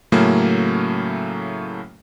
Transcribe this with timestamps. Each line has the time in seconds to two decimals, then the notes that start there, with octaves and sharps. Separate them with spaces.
0.12 A2 C#3 F#3 A3 A#3 C#4